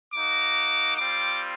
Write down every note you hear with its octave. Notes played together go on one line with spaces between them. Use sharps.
A#3 D#4 F#4 D6
G3 C4 F4 D6